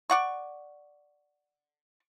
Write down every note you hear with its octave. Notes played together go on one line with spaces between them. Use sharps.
D5 F#5 C#6